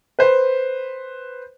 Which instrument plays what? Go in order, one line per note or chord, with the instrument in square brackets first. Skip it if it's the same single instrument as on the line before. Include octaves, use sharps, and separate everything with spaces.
[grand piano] B4 C5